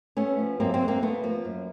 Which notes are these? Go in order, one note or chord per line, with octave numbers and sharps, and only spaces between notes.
A3 B3 C#4
F3
F#2 A#3 C4
A#3 C4
D3
A#3 C4
A3 B3
F3 A#3
F#2